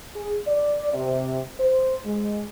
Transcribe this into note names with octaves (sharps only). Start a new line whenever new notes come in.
G#4
D5
C3
C5
G#3